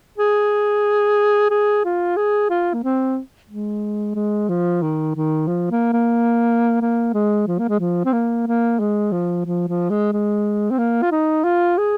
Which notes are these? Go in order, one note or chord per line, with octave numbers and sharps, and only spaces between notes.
G#4
G#4
F4
G#4
F4
A#3
C4
G#3
G#3
F3
D#3
D#3
F3
A#3
A#3
A#3
G#3
F3
A#3
G#3
F3
C4
A#3
A#3
G#3
F3
F3
F3
G#3
G#3
C4
A#3
F4
D#4
F4
G#4